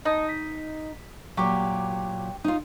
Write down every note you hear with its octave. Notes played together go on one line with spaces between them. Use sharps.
D#4 D#5 A5 D#6
B6
A#2 F#3 G4 C#6 D6
D#4 F4